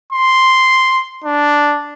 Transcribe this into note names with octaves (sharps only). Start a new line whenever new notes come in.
C6
D4